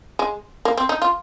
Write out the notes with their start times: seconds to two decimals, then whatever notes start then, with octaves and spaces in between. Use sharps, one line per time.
0.19 G#3
0.65 A#3
0.77 C4
0.89 D#4
1.02 F4